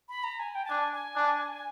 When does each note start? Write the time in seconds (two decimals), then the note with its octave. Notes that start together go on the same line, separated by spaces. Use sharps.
0.09 B5
0.23 A#5
0.39 G#5
0.55 G5
0.65 A5
0.70 D4 G#5
0.93 G#5
1.16 D4